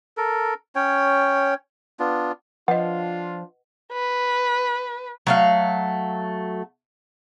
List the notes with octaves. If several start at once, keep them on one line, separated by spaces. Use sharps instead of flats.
A4 A#4
C#4 C#5 G5
B3 D4 F4
F3 D4 F4 B4 D#5 F#5
B4
F#3 A3 F5